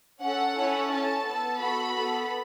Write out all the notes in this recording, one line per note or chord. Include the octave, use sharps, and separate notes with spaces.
C#4 A4 F#5
C#4 E4 A4
C#4 A4 A5
B3 A4
B3 F#4 A4 B5
B3 A4